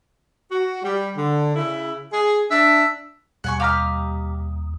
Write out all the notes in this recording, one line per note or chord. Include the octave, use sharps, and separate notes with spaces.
F#4
G3
D3
C#3 E4
G#4
D4 E5
D#2 B2 G3 F#5 G#5 C#6
G4 D#5 F5 A#5 F6